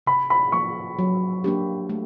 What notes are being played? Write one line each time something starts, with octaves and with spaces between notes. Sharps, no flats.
C3 B5
B5
F3 A#3 C#6
F#3
A#3 D4 G4
A3